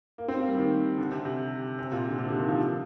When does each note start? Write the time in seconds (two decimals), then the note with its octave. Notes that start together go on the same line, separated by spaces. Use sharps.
0.18 A#3
0.28 C4
0.39 A#3
0.48 G3
0.58 D#3
0.98 D3
1.11 C3
1.25 C3
1.79 C3
1.92 A#2
2.09 D3
2.18 C3
2.29 D3
2.39 D#3
2.49 F3